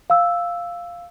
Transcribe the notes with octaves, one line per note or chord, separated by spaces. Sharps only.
F5 E6